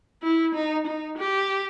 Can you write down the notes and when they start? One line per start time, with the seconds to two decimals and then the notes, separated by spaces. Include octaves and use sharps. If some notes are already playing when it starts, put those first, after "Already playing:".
0.23 E4
0.55 D#4
0.87 D#4
1.18 G4